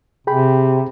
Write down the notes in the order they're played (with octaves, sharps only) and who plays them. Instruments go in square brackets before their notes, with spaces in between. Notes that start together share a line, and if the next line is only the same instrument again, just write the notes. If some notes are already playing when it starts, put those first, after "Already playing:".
[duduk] C3 [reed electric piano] G#4 G5 B5